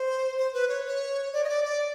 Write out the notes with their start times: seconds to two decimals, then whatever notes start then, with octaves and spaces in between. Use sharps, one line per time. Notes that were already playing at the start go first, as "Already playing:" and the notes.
Already playing: C5
0.37 C5
0.53 B4
0.69 C#5
0.85 C#5
1.33 D5
1.44 D#5
1.49 D5
1.65 D5